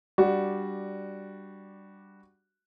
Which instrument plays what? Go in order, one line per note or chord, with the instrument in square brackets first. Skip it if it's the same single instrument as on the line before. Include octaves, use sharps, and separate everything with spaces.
[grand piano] G3 D4 F#4